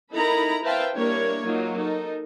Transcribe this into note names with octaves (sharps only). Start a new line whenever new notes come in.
D#4 E4 A4 A#4 A#5 B5
B4 C5 E5 F5 G5 A5
G3 A#3 D4 E4 A#4 C#5
F#3 A#3 D#4 F4
D#4 A4 A#4